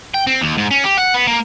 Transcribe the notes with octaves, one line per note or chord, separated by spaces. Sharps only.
G5
C4
D#2
G#2
C#4
G4
F#5
B3
A#3